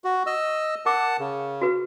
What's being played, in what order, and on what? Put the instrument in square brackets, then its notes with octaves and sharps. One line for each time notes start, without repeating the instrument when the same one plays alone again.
[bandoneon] F#4
D#5 E6
[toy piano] A#4 D6 E6 [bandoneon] F#5 A5
[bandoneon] C#3
[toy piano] F#4 B4